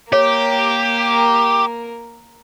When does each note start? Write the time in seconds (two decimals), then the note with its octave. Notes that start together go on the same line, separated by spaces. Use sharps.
0.13 A#3 G4 A#4 C#5